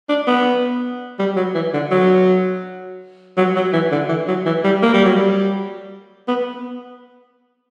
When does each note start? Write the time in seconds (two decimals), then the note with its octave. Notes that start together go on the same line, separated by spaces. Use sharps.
0.09 D4
0.27 B3
1.19 G3
1.36 F#3
1.55 E3
1.74 D3
1.91 F#3
3.37 F#3
3.56 F#3
3.73 E3
3.91 D3
4.09 E3
4.28 F#3
4.46 E3
4.64 G3
4.83 A#3
4.93 G3
5.04 F#3
5.16 G3
6.28 B3